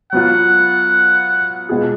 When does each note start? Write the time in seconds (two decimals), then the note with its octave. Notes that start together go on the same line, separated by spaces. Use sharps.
0.12 F#3 B3 F4 F#5
1.69 B2 G#3 B3 F4 G#4